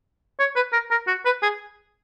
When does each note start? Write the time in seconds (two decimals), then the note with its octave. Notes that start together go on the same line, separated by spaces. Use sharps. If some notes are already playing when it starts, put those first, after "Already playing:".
0.39 C#5
0.56 B4
0.73 A#4
0.91 A#4
1.07 F#4
1.25 B4
1.42 G#4